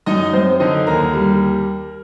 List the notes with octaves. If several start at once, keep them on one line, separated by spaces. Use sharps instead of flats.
F#2 D#4 D#5
F#2 C4 C5
D3 D#4 D#5
D#2 A#4 A#5
G3